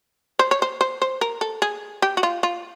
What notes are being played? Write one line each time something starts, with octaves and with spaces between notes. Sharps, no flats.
C5
C#5
C5
C5
C5
A#4
A4
G#4
G4
F#4
F4
F4